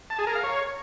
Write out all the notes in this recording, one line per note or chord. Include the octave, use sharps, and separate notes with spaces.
A5
G#4
A#4
F5
C#5